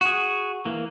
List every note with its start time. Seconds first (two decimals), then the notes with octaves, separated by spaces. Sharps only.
0.01 F#4 G#4
0.65 E3 A#3